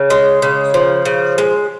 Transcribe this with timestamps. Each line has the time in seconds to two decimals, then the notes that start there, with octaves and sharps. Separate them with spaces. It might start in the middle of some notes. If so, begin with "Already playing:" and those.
Already playing: C#3
0.10 G#3
0.42 C#3
0.74 F3
1.05 C#3
1.38 G#3